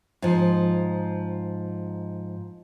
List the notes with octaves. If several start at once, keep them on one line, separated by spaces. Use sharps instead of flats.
G#2 F3